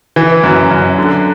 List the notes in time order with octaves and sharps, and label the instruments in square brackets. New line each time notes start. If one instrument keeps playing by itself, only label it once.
[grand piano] E3
F#2
F#2
D3